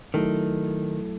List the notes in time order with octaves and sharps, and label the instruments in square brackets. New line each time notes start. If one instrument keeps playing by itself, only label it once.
[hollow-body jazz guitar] D#3 [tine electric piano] F#3 A3 E4 A4